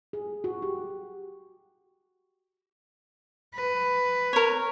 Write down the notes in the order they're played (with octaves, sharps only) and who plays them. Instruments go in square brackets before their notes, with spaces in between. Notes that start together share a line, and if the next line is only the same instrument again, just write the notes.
[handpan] G#4
F#4
G4
[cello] B4
[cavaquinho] A#4 C#5